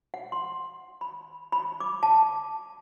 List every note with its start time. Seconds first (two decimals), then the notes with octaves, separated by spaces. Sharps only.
0.14 F#5
0.32 C6
1.01 B5
1.52 B5
1.80 D6
2.03 A5